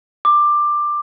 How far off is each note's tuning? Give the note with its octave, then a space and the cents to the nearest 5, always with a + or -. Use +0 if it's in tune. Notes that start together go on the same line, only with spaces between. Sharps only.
D6 +15